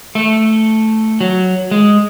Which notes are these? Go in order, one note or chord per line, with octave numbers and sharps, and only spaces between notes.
A3
F#3
G#3